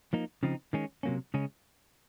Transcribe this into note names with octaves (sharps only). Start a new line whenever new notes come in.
F3 A#3 D#4
C#3 F3 C4 D#4
D#3 G#3 C#4
C3 F#3 A#3 C#4
C#3 G#3 C#4